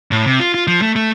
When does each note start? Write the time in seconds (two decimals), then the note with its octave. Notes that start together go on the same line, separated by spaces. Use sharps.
0.11 A2
0.26 C3
0.40 F4
0.54 F4
0.67 F3
0.82 A3
0.96 A3